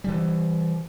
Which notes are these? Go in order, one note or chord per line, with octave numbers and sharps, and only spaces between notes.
E3 G3